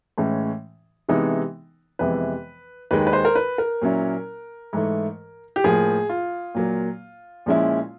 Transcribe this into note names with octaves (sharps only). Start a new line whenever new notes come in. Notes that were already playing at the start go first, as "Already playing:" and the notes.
A2 E3 G#3 C#4
C3 E3 G#3 B3 D#4
F2 C3 E3 G#3 B3 B4
D#2 D#3 G#3 B4
B4
C5
A#4
B4
A#4
A#2 F#3 A#3 C#4 E4
G#2 E3 A3
G4
A2 F3 A#3 G#4
F4
A#2 F#3 A#3
A#2 F3 G#3 C#4 E4